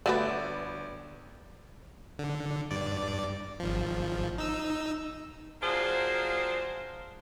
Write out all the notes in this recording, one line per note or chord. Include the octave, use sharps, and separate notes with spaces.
G1 A3 F#4 B4 D5 E7
D3
G2 D5
G#1 F3
D#4 E6
F#3 A#3 D4 F4 G#4 C5